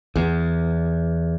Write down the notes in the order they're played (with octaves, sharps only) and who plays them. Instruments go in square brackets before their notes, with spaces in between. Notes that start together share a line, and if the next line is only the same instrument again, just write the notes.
[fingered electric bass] E2